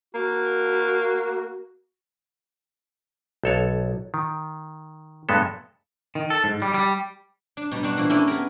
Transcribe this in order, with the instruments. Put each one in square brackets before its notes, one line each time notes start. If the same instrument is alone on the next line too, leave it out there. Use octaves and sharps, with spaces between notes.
[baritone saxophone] A#3 [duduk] F#4
[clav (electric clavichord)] B1 A4 C#5
D#3
G2 G#3 B3 A4
[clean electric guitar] D#3
A4
G#2
G3
G3
[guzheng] D4
B2 G3 D#4
G3 D4 D#4 F#4
A#2 E3 F3 G3 A#3
A#3 C#4 D4 E4 G4 A4
B3 G#4 A#4